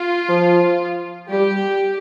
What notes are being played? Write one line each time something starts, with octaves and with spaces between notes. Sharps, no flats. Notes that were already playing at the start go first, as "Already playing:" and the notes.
Already playing: F4
F3
G3 G4